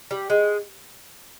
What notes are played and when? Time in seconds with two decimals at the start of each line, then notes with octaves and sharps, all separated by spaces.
0.11 G3
0.30 G#3